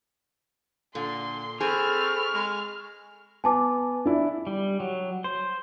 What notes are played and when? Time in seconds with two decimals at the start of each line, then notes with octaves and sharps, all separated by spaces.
0.95 A#2 D3 C6
1.61 C4 G#4 A4 B5 C#6 F6
2.34 G#3
3.44 B3 G#5 A5 D6
4.06 D4 E4
4.47 G3
4.80 F#3
5.24 C5